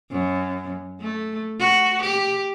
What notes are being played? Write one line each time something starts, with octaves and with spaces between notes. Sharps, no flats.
F#2
A3
F#4
G4